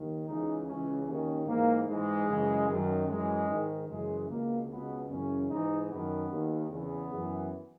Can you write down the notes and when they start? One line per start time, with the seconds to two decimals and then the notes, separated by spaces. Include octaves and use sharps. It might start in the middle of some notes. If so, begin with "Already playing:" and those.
Already playing: D#2 D#3
0.27 C#2 C#3 E3 D#4
0.67 C#2 C#3 E3 C#4
1.06 D#2 D#3 C#4
1.47 G#2 E3 A#3
1.87 G#2 E3 G#3
2.28 F#2 C#3 E3
2.68 F#2 D#3
3.07 F#2 E3 G#3
3.48 G#2 D#3
3.88 F#2 C#3 E3 G#3
4.29 C#2 B2 A#3
4.68 C#2 B2 B3
5.09 F#2 C#3 E3 C#4
5.49 G#2 E3 D#4
5.89 F#2 D#3 B3
6.29 D#2 D#3
6.70 E2 C#3 E3 B3
7.11 F#2 E3